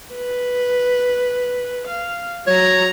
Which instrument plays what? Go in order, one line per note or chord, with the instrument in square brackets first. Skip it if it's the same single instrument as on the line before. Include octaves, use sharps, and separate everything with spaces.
[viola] B4
F5
[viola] F#3 A#5 [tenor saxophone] C#5